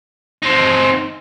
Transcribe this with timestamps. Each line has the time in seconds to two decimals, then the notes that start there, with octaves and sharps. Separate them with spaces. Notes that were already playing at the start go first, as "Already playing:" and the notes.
0.42 C4 D#4